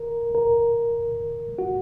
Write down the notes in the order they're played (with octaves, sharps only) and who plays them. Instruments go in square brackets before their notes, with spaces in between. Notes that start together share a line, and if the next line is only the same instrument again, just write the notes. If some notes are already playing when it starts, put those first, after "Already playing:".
Already playing: [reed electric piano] A#4
A#4
F#4